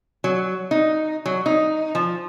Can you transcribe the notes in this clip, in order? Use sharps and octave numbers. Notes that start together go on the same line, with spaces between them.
F#3
D#4
F#3
D#4
F3